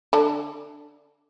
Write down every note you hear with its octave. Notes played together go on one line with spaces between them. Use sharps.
D3 D4